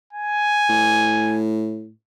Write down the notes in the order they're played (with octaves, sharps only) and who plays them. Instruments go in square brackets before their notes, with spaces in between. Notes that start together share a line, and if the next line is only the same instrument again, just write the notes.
[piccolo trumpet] G#5
[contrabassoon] A2